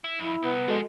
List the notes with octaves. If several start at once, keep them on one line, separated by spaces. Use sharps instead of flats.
E4
F2 E4
C2 B3
F3 G#3 D4 F#4 A4 D#5